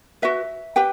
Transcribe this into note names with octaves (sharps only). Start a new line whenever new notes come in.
F#4 B4 E5
G4 B4 G5